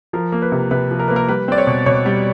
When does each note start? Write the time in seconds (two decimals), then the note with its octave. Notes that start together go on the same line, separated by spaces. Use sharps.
0.13 F3 A#4
0.32 A#3
0.42 B4
0.52 C3
0.71 C3 B4
0.91 F3
0.99 A#4
1.08 A#3 B4
1.16 A#4
1.29 G3 B4
1.48 C4 D5
1.58 C#5
1.67 B2
1.86 B2 C#5
2.06 G3